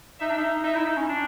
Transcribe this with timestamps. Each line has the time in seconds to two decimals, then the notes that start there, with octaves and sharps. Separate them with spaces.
0.20 D#4 E5
0.29 D4
0.38 D#4
0.64 D#4 E5
0.75 E4
0.86 D#4
0.97 C#4
1.09 D4